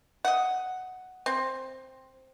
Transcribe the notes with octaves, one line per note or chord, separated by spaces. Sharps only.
D#5 F#5
C4